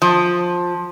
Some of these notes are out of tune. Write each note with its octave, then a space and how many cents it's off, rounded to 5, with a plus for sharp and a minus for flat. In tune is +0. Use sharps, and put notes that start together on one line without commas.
F3 +15